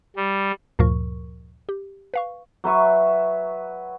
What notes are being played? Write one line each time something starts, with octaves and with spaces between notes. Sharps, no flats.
G3
D2 G2 A#2 F3 A#4 C#6
G4
B4 F5 C#6
F#3 B4 E5 C#6